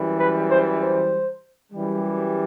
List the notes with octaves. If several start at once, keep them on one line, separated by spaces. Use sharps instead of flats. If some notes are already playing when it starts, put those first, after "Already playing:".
Already playing: F#2 E3 G3
B4
C5
C5
F#2 E3 G3